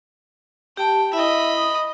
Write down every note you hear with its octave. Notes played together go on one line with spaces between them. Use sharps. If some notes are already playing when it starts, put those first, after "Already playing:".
G4 G5 A5
E4 D#5 E5 B5
D#6